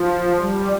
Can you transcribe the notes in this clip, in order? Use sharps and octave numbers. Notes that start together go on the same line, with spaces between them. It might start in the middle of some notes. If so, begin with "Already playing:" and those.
Already playing: F3
G3